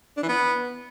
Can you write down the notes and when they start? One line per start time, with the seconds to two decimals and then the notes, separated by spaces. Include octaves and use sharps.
0.17 D4
0.23 E3
0.28 B3